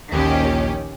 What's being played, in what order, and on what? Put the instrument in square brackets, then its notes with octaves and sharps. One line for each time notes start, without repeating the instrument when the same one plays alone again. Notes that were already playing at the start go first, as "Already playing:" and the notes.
[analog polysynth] A#1 D#2 [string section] D#3 C#4 G4